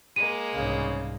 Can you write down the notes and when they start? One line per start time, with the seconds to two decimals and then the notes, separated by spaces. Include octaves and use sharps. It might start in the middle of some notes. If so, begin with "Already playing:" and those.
0.16 G#3 A#3 D#7
0.54 C2 G#2 C#3